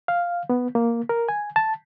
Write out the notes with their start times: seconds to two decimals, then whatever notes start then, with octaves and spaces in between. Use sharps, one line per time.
0.08 F5
0.50 B3
0.75 A#3
1.09 A#4
1.29 G#5
1.56 A5